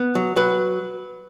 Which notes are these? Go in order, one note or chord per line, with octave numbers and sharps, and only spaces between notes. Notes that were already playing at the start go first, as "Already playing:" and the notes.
Already playing: B3
F#3
F#3 B4